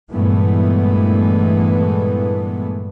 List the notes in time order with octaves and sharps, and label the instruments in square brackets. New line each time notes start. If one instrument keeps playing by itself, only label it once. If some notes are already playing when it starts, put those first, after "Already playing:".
[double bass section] G2 A#2 E3 G#3 A3 B3